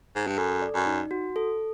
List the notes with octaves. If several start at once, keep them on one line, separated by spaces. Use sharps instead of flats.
G#2
G2
F#2 A4
D5
F#2
D#4
F#4
A4